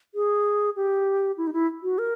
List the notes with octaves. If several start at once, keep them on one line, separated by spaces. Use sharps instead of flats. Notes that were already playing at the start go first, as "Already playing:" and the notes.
G#4
G4
E4
D#4
E4
F#4
A#4